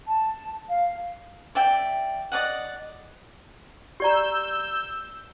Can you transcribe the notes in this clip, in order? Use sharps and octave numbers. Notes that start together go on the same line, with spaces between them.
A5
F5
D5 E5 G5
D5 D#5 F#5
G4 D5 A#5 E6 G6